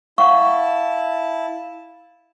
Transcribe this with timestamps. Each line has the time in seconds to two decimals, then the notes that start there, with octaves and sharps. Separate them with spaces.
0.18 E4 F5 F#5 A5 C#6